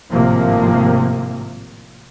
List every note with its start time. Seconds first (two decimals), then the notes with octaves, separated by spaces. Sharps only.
0.12 G#1 A2 C3 F3 A#3